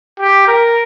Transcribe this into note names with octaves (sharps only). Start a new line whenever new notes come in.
G4
A#4